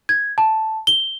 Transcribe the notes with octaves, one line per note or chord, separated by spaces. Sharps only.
G#6
A5
G7